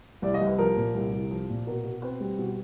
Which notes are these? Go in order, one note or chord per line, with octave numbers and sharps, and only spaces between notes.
C2 D5
D#5
C2
B4
F3 A#4
A#2
C2
C2
F3
A#2
B2 A#4
B2
C4 B4
G3
B2